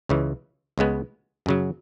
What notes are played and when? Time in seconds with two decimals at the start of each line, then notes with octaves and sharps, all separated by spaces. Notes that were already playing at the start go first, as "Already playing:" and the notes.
0.09 C#2 C#3 E3
0.78 C#2 C#3 G#3 B3
1.46 F#2 C#3 F#3